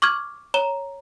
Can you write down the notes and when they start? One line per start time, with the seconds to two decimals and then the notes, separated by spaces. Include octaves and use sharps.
0.02 C#6 D6 F6 G#6
0.54 C#5 A#5 E7 G7